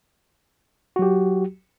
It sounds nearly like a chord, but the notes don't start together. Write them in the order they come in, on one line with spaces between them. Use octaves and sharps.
F#4 F#3 G4